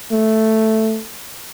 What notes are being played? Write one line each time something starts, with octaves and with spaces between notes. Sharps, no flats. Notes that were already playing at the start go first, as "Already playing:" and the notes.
A3